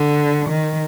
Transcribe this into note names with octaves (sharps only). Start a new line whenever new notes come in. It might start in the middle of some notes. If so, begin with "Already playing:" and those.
Already playing: D3
D#3